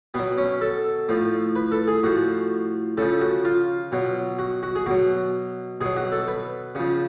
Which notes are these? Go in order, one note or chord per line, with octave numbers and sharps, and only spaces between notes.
B2 F#3 B3
C#4
A4
A2 F3
B4
A4
G#4
A2 F3 F#4
C#3 F3 A4
F#4
F4
B2 F#3
F#4
F#4
G#4
B2 F#3 F#4
B2 F#3 G#4
F#4
A4
B4
C#3 F3